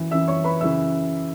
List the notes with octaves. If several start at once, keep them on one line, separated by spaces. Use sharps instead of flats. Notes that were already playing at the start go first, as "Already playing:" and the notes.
Already playing: F#2 E3
F#2 E3 E5 E6
C#5 C#6
B4 B5
F#2 C#3 E3 E5 E6